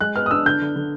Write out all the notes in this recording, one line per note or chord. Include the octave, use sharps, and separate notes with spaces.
G#3 F#6
B3 F6
D#6
D4 E6
D3 G6
D3
D3